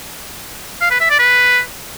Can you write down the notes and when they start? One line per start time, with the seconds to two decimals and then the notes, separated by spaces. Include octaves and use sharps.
0.81 F5
0.91 B4
1.00 E5
1.10 D5
1.19 B4